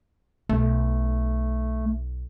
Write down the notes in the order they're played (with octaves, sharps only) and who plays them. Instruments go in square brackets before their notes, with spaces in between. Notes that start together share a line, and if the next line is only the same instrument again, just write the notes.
[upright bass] B1 [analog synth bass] A3